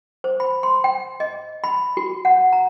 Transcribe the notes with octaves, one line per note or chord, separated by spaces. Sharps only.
C5
B5
C6
G5
D#5
B5
F#4
F#5
A#5